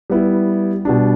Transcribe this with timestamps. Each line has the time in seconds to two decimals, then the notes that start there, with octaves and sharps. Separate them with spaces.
0.10 G3 B3 E4
0.85 B2 G3 D4